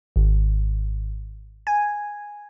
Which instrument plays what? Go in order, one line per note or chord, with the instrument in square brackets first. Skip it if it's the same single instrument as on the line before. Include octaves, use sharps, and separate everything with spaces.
[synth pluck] G#1
G#5